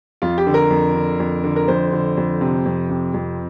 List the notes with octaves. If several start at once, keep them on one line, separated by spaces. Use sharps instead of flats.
F2 F4
G4
D3
A#4
F2
D3
F2
D3
A#4
F2 C5
D3
F2
C3
F2
C3
F2